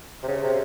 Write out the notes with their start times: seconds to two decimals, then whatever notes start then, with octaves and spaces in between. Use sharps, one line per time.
0.23 C3
0.28 C#3
0.43 C3